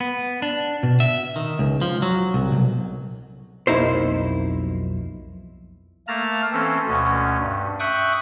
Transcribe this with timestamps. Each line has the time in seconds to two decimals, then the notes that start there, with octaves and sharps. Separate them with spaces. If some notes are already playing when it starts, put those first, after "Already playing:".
0.01 B3
0.42 D4
0.83 B2
1.00 E5
1.36 D#3
1.59 C#2
1.81 F3
2.02 F#3
2.34 C2
2.52 B1
3.67 B1 F2 A#3 D#4 E4 C5
6.08 A3 A#3 A5 A#5 F6
6.52 E3 C4 C#4 A4
6.87 D2 B2 C#4
7.39 G2
7.80 E5 G5 C#6 D#6 F#6